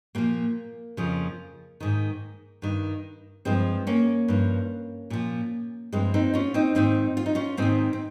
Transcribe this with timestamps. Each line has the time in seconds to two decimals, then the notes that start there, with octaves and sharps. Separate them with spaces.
0.15 A#2 F3 G3 A#3
0.97 F2 C#3 F3
1.80 G#2 D#3
2.62 G2 D#3
3.45 G2 F3 G#3 C4
3.87 A#3 C#4
4.28 G2 F3
5.10 A#2 F3
5.93 G2 F3 G#3 C4
6.14 C4 D#4
6.34 C#4 F4
6.54 C4 D#4
6.75 G#2 D#3 C4 D#4
7.17 F4
7.26 D#4
7.35 C#4 F4
7.57 G#2 D#3 C4 D#4
7.93 C4